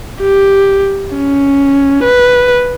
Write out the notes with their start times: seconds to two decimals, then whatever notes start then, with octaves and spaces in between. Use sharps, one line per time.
0.21 G4
1.16 C#4
2.04 B4